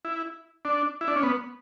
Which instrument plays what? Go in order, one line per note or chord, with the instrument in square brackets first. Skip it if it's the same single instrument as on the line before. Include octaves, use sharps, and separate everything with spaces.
[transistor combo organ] E4
D4
E4
D4
C#4
B3